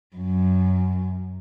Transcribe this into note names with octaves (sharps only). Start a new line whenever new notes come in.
F#2